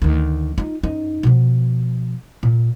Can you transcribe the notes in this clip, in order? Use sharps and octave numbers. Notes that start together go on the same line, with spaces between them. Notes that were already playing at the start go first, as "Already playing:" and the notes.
D2 D#3
D#4 F4
F#2 D#4
B2 F3
A#2